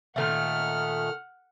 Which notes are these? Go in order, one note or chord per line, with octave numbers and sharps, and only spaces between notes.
A#2 D#3 A3 F#5 F6